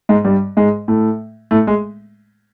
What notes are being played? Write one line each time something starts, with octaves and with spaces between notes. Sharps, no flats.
G#2 G#3
G2 G3
G#2 G#3
A2 A3
A2 A3
G#3